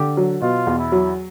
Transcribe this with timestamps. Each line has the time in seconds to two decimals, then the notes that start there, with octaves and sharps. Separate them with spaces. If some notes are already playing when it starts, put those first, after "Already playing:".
Already playing: D3 G4
0.17 F#3
0.41 B2 F4
0.67 E2
0.79 E4
0.92 F#3